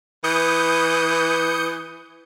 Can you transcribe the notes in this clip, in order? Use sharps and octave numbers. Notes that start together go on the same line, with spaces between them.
E3 D#6 G6 C#7